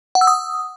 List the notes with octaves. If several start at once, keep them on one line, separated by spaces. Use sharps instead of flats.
F#5
E6
D#6